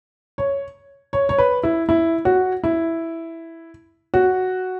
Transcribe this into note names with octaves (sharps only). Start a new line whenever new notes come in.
C#5
C#5
C#5
B4
E4
E4
F#4
E4
F#4